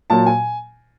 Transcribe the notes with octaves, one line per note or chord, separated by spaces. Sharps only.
A#2 F#3 A5
G#5